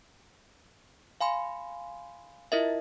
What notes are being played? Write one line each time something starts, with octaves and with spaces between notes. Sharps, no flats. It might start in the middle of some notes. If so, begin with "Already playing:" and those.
F5 G#5 B5 C6
E4 F4 A#4 D#5 E5